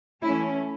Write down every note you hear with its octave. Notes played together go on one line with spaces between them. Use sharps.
E3 A3 C#4 E4